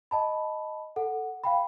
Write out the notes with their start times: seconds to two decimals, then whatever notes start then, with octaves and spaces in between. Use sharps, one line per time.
0.11 D#5 A5 B5
0.96 A4 F#5
1.44 F5 G5 B5